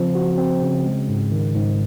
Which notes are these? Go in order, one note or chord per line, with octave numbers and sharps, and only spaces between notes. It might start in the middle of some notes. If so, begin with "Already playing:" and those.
Already playing: C#3 F3 C4
F#4
C4
C#3
G#3
G#2
D#3
G#2